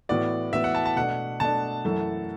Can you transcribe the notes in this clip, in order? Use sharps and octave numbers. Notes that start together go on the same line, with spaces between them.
A2 E3 B3 F#4 B4 D5
A2 E3 B3 F#4 B4 E5
F#5
A5
A5
B2 A3 D4 F#5
B2 A3 D4 A5
F#2 E3 A3 E4 A4